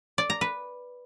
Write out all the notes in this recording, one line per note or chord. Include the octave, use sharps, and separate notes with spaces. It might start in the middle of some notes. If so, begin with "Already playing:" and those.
D5
A#5
B4